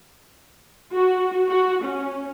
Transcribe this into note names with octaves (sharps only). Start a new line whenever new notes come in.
F#4
F#4
C#4